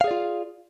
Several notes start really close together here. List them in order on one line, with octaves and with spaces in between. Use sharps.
F5 G#4 D5 F4